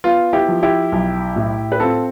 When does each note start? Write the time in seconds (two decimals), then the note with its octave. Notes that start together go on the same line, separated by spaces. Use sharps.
0.04 B3 F4
0.33 E4 G4
0.48 F3
0.63 E4 G4
0.92 B1
1.36 A2
1.72 B4
1.80 C4 F4 A4